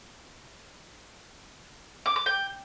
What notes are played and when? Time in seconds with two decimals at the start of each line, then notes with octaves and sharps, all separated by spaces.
2.06 D6
2.16 D6
2.26 G5